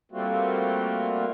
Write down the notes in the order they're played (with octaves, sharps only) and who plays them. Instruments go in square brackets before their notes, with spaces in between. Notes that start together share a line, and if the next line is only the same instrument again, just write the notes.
[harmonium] G3 A3 A#3 C4 F4 F#4